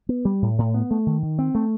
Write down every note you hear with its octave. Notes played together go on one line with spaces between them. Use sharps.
B3
G3
A2
A2
B3
A3
D#3
D#3
C4
A3